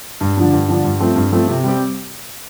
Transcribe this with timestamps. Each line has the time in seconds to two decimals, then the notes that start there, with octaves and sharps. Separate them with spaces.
0.21 G2
0.37 D3 F3 D4
0.53 G2
0.69 D3 F3 D4
0.84 G2
1.00 F3 A3 C4
1.16 G2
1.32 F3 A3 C4
1.48 C3
1.64 G3 C4 G4